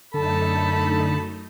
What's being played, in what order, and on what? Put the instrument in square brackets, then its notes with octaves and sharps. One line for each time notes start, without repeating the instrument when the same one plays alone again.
[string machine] F#2 A3 D#4 [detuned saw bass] D3 [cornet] A4 [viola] A5 B5